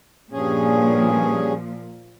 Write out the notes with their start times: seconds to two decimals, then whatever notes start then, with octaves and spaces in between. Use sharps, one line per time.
0.32 G2 A#2 F3 C#4 G#4